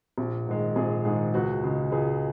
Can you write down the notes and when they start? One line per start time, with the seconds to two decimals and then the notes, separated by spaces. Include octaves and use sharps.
0.18 A#1
0.46 G#2 D#3 G#3
0.76 A#1 G#4
1.05 G#2 D#3 G#3 G#4
1.34 C#2 F#4
1.63 C#3 G#3
1.92 C#2 G#4